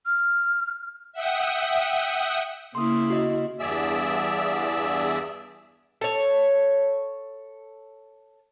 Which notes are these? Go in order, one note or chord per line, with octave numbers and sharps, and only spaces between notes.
F6
E5 F#5 G5 D#6
C#3 A#3 E4 C6 D#6
F#4 D#5
E2 G2 G#4 D5 E5 E6
A4 C#5